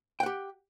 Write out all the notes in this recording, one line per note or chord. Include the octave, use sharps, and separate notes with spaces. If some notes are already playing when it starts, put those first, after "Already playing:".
G4 F#5 G5